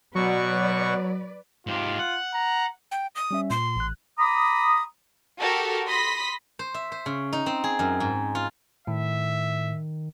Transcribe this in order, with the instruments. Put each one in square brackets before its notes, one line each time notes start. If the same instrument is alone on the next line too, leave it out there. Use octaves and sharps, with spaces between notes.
[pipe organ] B2 F#4 C#6 [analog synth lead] F#3 [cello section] B4 D5
[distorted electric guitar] G#2 G4 [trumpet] F4
[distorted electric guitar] F#5
[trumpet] A#5
[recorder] G5
D#6
[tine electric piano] G3 C#4 E5
[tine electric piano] A#2 [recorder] C6
[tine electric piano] A1 F#6
[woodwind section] A#5 B5 D6 D#6
[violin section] F#4 G4 A4 A#4
B5 C6 D#6 A#6 B6
[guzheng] C5
E5
C5
C#3
D#4
C4
G#4
F#2
G#2
F4
[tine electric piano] A2 [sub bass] D#3 [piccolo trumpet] E5